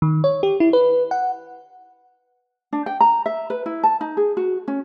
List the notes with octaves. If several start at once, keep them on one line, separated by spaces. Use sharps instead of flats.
D#3
C#5
G4
E4
B4
F#5
D4
G5
A#5
E5
B4
E4
A5
D#4
G#4
F#4
C#4